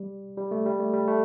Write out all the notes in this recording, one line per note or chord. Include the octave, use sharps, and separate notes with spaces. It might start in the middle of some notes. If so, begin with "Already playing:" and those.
Already playing: G3
G3
A3
G3
A3
G3
A3